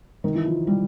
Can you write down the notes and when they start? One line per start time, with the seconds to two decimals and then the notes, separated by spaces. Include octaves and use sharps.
0.24 D#3
0.35 E3
0.45 F3
0.67 G3